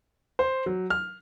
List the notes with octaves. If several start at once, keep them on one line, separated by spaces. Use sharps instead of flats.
C5
F#3
F6